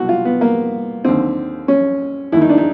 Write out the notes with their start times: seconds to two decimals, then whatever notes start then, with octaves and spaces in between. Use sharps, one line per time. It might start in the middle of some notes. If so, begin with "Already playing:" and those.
Already playing: C2 B2 F#4
0.09 F4
0.25 B3
0.41 A#3
1.05 D#2 D3 C4
1.68 C#4
2.32 D#2 E4
2.37 D#3 D#4
2.49 D4
2.58 D#4